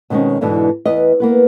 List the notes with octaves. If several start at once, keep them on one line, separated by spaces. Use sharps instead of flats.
B2 D#3 G#3 C4 C#4
E2 G#2 B2 D3 E3
E2 B4 D#5
A#3 B3 B4